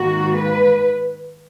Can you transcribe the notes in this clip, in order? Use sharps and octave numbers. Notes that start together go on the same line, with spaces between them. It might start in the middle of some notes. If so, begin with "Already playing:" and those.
Already playing: G#2 D#3 A#3 F#4
B4